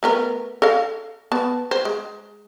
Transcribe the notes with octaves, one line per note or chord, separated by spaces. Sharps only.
A3 B3 A#4
A4 D#5 F5
B3 A5
C5
G#3